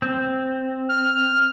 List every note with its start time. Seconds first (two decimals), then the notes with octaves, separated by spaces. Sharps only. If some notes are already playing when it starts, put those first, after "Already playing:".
0.02 C4
0.89 F6